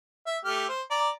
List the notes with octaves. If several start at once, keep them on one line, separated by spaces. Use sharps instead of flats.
E5
A3 G4 F6
C5
D5 A#5